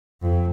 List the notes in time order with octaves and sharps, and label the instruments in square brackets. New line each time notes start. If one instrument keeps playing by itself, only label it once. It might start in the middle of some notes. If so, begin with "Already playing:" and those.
[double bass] F2